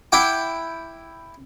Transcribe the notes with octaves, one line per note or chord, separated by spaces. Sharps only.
E4 F#5 G5 D6